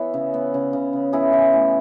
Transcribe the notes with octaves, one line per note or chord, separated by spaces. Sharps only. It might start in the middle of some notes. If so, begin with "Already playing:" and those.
Already playing: E3 B3 E4 B4 C#5
C#3
B3
C#3
C#3
C#3
B3 E4 G#4
E3
A2